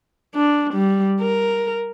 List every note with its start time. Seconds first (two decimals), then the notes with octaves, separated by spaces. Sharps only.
0.35 D4
0.74 G3
1.21 A#4